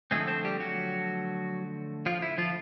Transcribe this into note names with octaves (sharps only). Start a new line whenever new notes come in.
D3 F3 G#3 A3 C4 G#4
C4 C5
G3 G4
F#3 F#4
F3 F4
E4
F3 F4